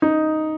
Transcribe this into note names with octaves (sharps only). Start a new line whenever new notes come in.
D#4